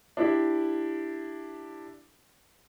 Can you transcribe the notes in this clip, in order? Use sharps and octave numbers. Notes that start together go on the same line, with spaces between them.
D4 E4 G4